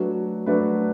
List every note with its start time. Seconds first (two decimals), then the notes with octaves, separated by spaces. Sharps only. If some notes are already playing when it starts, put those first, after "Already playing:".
Already playing: F#3 A3 D4 F#4 B4
0.46 F#3 A3 D4 F#4 B4